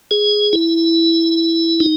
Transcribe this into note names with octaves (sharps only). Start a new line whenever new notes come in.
G#4
E4
D#4